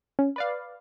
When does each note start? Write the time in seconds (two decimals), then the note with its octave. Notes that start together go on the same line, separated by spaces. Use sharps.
0.19 C#4
0.36 B4 D5 F5